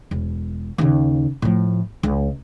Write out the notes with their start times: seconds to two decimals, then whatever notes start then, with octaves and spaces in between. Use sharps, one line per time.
0.11 E1
0.78 D#2 C#3
1.42 A2 F3
2.03 C#2